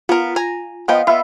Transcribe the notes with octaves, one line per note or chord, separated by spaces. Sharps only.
B3 F4 A#4
G#5 A#5
F3 B3 D#5 F5 G5
B3 F4 E5 B5